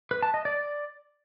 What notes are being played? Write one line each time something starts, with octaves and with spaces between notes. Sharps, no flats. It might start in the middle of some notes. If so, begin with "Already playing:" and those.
B4
A5
D#5
D5